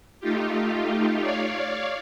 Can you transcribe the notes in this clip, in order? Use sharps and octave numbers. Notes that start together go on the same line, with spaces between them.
A3 D#4 F4 G4
C#5 D5 F5